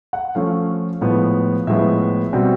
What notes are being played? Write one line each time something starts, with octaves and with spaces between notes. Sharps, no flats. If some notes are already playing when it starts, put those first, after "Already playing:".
F#5
F3 A3 C#4 F5
A2 F3 G#3 B3
A2 F3 G#3 B3 E5
B2 G3 C4